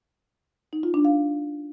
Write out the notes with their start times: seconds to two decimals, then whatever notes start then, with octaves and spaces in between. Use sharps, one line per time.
0.73 D#4
0.83 F4
0.94 D4
1.05 F5